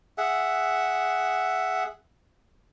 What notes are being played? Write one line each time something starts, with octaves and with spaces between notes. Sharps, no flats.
G#4 E5 F#5